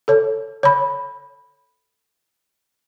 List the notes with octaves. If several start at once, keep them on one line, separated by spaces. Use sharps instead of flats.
A4 C#5
C#5 B5